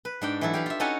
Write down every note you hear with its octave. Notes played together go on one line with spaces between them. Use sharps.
B4
G#2 D4 G5
E3 F#3 E4 A4
G4 F5 B5
F4 E5
C#4 D#4 F#4 A4 F#5 G#5